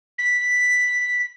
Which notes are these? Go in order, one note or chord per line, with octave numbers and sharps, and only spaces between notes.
B6